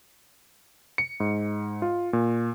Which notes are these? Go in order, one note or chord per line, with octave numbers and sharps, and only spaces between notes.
C#7
G#2
F4
A#2